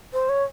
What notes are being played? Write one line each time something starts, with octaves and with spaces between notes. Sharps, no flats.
C5
C#5